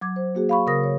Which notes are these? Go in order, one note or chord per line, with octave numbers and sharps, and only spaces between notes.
F#3 D6 G#6
C5
A#3 F#4 G#4
F5 B5 C#6
C#3 A#4 D#6 A#6
C#5